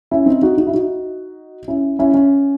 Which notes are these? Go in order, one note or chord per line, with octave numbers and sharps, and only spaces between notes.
C#4 E4
C4 D#4
D#4 F#4
D#4 F#4
E4
D#4 F#4
C#4 E4
C#4 E4
C#4